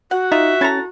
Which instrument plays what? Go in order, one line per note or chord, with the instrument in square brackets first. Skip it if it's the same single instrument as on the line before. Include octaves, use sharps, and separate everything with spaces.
[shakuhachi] F#4 [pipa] F#5
[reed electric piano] D#4 [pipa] F4 [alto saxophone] E5
[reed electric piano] C#4 A6 [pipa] E4 A4 A#5